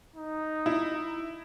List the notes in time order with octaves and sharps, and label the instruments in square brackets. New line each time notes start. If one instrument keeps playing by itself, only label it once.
[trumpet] D#4
[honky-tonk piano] E4